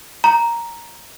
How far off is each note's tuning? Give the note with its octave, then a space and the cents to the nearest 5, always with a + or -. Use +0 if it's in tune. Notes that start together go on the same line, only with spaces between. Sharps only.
A#5 +0